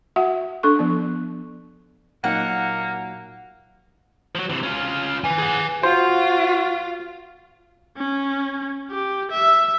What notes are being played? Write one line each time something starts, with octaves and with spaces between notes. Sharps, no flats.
F#4 E5 F#5
D4 A4 C#6
F3 B3
A#2 F#3 A#3 D#4 F#5
F3 F#3
C3 E3
C#4 F4
B4 G#5
G#4 F#5
F4 F#4 C5
C#4
G4
E5